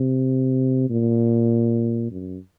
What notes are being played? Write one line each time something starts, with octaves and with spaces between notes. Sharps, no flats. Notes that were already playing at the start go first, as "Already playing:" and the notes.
Already playing: C3
A#2
F#2